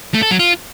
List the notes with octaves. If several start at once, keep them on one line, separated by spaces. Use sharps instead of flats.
A3
A4
F#3
F4